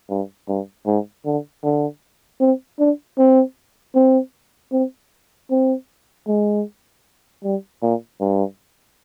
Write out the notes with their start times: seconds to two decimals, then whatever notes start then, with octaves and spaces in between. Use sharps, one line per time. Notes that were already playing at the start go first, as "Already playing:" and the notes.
0.09 G2
0.48 G2
0.86 G#2
1.25 D3
1.63 D3
2.40 C4
2.79 D4
3.18 C4
3.95 C4
4.72 C4
5.50 C4
6.27 G#3
7.44 G3
7.82 A#2
8.20 G2